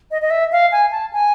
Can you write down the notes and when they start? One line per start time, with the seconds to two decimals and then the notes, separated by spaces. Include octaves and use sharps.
0.11 D#5
0.22 D#5
0.30 E5
0.52 F5
0.72 G#5
0.92 A5
1.13 G#5